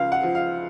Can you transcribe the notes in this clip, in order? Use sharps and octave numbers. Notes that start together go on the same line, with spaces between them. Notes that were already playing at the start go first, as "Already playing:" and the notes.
Already playing: C#2 F3 F5
F#5
F3
F5